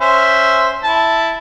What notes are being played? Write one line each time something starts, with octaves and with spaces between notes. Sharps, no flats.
C#4 C5 E5
E4 A5